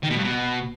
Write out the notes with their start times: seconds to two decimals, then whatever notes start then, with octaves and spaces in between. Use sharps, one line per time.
0.03 D#3
0.10 B2
0.17 G2
0.23 B2